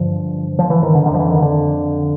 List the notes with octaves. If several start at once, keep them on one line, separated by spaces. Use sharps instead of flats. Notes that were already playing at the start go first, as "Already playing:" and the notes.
Already playing: G2 D3 F3
F3
E3
D#3
D3
F2 D3 D#3 F3
E3
D#3
D3